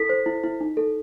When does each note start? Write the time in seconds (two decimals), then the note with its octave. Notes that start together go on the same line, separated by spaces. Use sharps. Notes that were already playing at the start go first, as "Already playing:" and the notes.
Already playing: E4 A4 B6
0.09 C5
0.26 E4
0.43 E4
0.61 D#4
0.77 A4